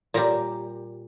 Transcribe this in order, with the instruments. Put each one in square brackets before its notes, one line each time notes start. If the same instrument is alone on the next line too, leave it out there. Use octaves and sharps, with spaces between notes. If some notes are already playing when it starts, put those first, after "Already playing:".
[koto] A#2 G3 A#4